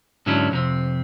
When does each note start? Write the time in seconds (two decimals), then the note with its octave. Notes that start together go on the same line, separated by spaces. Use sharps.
0.26 G#2 D3 F#3 C#4 D4 E4
0.51 F2 C3 C4